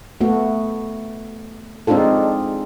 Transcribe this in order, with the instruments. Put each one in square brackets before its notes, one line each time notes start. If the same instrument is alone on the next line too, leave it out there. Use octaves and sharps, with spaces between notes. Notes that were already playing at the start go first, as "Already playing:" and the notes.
[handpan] A3 B3 F#4
G#3 C4 D4 D#4 F4 A4